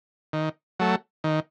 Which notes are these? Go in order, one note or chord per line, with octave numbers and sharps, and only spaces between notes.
D#3
F#3 A3
D#3